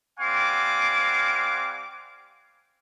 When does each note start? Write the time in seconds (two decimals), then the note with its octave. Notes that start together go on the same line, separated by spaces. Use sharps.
0.20 G3 C4 F5 F#5 G#5 D6